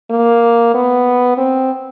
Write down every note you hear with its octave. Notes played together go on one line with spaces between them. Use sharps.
A#3
B3
C4